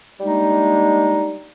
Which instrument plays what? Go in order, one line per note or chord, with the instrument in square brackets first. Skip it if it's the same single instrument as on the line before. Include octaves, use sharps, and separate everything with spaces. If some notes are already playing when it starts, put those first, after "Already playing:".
[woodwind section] G3 G#3 A#3 D4 D#4